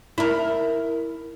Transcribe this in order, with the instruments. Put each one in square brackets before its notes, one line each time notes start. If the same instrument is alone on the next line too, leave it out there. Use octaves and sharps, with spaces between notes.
[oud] E4 A#4